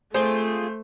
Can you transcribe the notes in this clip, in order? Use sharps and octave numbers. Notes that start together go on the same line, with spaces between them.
A3 C4 F4 G#4 C5